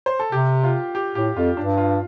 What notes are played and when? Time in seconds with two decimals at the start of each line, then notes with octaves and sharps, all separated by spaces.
0.06 C5
0.19 A4
0.32 C3 G4
0.64 F4
0.95 G4
1.15 A2 G4
1.36 F2 F4
1.57 G2 D4
1.77 F4